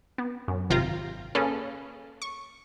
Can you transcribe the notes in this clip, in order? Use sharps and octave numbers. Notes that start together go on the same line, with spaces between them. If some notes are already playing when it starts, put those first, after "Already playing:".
B3
F#2
G#1 C3 F4 F5 G5 A#5
A#3 C#4 G#4 A4 B4
C#6